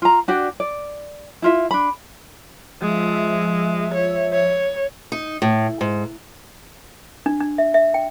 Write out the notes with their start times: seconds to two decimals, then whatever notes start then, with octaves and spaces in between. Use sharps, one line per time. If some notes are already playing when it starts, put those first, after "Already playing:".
0.02 F4 A#5
0.28 D4 F#4 G4 D5
0.60 D5
1.42 E4 F4 E5
1.71 D4 B5
2.82 F3 G#3 E5
3.94 C#5
4.34 C#5
5.12 D#4
5.42 A2
5.81 G#2
7.26 D4
7.41 D4
7.58 E5
7.74 E5
7.94 G5